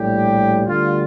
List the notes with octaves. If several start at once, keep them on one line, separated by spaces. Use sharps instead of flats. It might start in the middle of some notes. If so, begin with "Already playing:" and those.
Already playing: A#1 A2 G3 G4
D2 D3 G3 F4